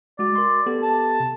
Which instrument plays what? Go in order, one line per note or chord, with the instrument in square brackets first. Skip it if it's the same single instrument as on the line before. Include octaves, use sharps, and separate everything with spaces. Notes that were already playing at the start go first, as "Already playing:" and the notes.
[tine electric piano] G#3 F#4 [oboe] D5
[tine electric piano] A#4 C6
B3 G4 A4
[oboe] A5
[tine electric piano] C3